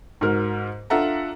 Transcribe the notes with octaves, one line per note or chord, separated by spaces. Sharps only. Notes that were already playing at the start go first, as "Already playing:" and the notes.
G#2 F#4 A#4
D4 F4 A4 E5 F#5 A#5